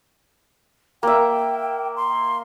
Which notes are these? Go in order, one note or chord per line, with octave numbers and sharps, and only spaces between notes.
A#3 E5 G5
C6